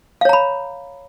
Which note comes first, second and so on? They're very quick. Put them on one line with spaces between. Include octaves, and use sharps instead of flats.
F5 C#5 A#5 B5